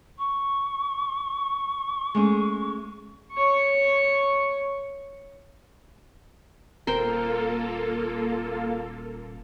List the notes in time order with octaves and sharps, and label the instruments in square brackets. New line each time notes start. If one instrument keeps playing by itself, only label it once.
[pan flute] C#6
[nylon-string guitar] G#3 A3 C#4
[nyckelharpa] C#5 C#6
[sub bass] D#1 [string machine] A#3 F4 A4 [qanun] A#4 C5 G5